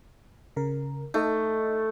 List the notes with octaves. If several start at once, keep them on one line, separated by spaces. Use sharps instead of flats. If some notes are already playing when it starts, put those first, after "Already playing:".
C#3 A#4
A3 D#4 A4 D#5